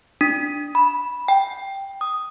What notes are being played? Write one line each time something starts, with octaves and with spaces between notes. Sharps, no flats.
D4
B5
G5
D#6